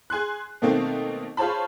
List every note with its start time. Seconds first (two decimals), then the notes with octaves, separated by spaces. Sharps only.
0.10 G#4 G#5 C6 F#6
0.62 B2 D#3 A3 A#3 C4
1.37 F4 G#4 C5 C#5 A5 B5